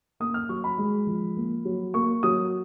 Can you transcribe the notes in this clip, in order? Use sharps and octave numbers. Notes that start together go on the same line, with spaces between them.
A#3 D#6
F6
F#3 C#6
B5
G#3
F3
A#3
F#3
A#3 C#6
F#3 D#6